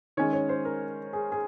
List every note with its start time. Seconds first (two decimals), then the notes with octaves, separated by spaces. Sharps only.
0.17 D#3 G#3 C#4 C#5
0.33 C#5
0.49 C5
0.65 A#4
1.13 G#4
1.32 G#4